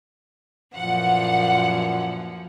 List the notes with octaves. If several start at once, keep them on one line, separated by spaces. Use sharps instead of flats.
F#2 A#2 E3 F3 F#5